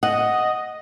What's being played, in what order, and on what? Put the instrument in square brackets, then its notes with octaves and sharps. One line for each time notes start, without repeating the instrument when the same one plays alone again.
[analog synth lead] D#5 [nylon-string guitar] F#5